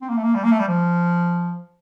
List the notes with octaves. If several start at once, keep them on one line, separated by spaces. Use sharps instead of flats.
C4
A#3
A3
A#3
G3
A#3
A3
G3
F3